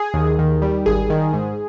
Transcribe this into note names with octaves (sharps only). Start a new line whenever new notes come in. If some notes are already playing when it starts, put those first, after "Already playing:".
Already playing: G#4
D#2
D#3
G3
G#1 G#4
D#3
G#2